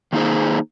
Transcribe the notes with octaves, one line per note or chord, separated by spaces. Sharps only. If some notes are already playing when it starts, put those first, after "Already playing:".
D#3 A#3 D#4 G#4 C5